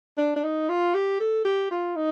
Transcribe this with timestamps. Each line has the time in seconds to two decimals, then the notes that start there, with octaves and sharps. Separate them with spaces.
0.18 D4
0.36 D4
0.43 D#4
0.69 F4
0.94 G4
1.20 A4
1.45 G4
1.71 F4
1.96 D#4